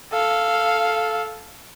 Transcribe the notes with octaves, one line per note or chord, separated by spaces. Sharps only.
A4 F5